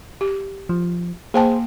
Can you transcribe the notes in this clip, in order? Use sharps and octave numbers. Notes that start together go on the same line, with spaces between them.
G4
F3
A#3 G#4 C5 G5 A5